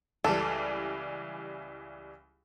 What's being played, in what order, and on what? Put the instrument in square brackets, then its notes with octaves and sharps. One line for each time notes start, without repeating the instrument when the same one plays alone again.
[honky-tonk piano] C#2 E3 G3 [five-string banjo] A4